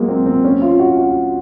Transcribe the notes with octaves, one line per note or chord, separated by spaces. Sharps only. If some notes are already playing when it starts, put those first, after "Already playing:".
Already playing: F#3 G#3 A#3
C4
C4
C#4
F4
F#4
F#4